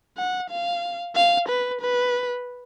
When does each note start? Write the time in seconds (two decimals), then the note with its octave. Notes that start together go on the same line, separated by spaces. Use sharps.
0.18 F#5
0.50 F5
1.15 F5
1.49 B4
1.81 B4